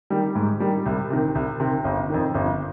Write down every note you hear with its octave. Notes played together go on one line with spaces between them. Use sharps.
D#3 G3
G#2
D#3 G3
C2
C3 D#3
C2
C3 D#3
G1
F2 D#3
G1